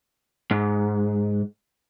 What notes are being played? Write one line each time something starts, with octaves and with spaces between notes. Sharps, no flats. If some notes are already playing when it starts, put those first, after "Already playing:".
G#2